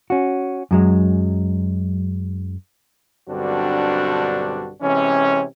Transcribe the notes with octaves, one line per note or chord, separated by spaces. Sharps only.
C#4 F#4
F#2 F#3 G#3
B1 G2 D3 C4 D4 F#4
C3 E3 G#3 C#4